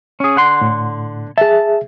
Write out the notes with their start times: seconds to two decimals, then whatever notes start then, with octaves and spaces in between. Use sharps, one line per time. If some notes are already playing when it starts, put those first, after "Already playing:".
0.20 C#4 G#4
0.36 D3 F#5 C6
0.61 A2
1.38 G#4 E5 A5